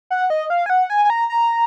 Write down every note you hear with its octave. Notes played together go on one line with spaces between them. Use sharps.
F#5
D#5
F5
G#5
F#5
G#5
G#5
A#5
A#5